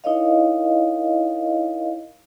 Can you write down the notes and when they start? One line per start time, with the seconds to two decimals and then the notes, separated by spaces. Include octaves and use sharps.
0.04 D#4 E4 A#4 C#5 D#5 F5